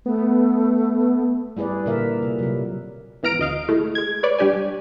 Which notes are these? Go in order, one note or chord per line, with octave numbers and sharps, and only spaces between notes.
A3 B3
G3 E4 G#4 B4 D5
A#2 D3 A#3 A#4 E5
C3
C3 F#3
G#1 E3 B3 A#5 F6 D7
D2 D#5 F5
G#3 A3 E4
G#3 G#6
B4 C#5 D5
G3 D4 G4 D5 G#5